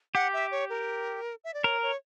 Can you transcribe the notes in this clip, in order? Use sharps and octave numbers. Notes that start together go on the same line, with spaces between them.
G4 F#5
E5
C#5
A#4
E5
D5
A#4 C#5
C#5